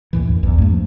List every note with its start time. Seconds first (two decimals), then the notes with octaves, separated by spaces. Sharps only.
0.13 D#2 A2 E3
0.27 F#2
0.43 B1 E2 G2
0.58 G2 A3
0.70 F3